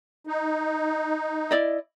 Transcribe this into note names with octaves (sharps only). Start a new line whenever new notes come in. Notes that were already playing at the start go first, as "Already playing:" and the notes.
D#4
E4 D5 D#5